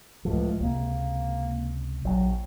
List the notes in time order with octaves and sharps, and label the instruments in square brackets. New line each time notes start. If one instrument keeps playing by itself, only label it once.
[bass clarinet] C#2 [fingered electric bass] A2 F3
[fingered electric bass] C#2 C3 [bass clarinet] A#3
[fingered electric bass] A#1 [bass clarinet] F#3